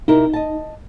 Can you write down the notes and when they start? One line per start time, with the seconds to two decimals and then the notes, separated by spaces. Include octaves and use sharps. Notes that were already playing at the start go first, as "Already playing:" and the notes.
0.08 C3 D#4 E4 A#4
0.34 D#5 A5